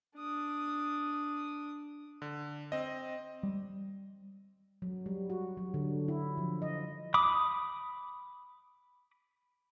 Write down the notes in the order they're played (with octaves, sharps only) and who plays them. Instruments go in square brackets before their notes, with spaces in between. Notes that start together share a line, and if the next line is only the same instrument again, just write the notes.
[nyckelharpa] D4 D#6
[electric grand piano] D3
C4 D#5
[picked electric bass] G3
[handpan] F#3
G3
F#4
F#3
D3
E4
F3
D#5
[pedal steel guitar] B5 D6 D#6